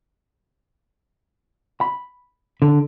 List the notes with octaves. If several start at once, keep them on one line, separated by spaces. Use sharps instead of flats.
B5
D3